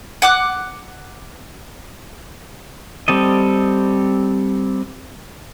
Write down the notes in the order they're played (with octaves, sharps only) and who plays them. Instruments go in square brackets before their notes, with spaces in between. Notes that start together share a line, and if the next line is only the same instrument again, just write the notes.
[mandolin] F#5 D6 F#6
[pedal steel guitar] G3 C4 A4 D#5